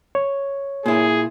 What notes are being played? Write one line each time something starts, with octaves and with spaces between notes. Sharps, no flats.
C#5
A#2 E4 G#4